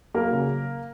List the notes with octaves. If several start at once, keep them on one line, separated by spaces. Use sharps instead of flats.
F#3 A#3 A#4
C#3